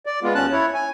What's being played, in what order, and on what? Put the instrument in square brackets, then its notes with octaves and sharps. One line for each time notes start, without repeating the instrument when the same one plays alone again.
[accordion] D5
G#3 B3 F4
D#2 C#4 A5 F#6
E4 C#5
G#5